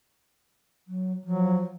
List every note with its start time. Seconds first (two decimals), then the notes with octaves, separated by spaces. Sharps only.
0.88 F#3
1.25 F3 F#3